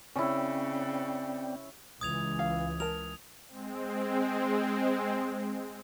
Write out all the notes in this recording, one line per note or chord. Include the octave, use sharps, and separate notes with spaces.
C#3 C4 C#4 E4 D5 G5
C#2 E3 D#6 G#6 F7
F5
A#4 A5 F7
G#3 C4